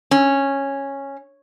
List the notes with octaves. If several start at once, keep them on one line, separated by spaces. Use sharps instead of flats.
C#4